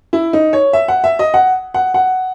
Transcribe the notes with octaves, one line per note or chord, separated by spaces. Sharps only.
E4
D#4
C#5
E5
F#5
E5
D#5
F#5
F#5
F#5